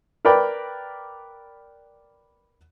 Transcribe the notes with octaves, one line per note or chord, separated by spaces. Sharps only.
A#4 B4 D5 G5 B5